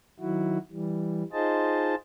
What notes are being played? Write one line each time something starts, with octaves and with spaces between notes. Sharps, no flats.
D#3 F#3 E4 F#4
E3 G3
D#4 F4 G#4 C5 D#5 A5